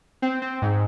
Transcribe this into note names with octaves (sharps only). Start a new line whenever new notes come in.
C4
C4
G#2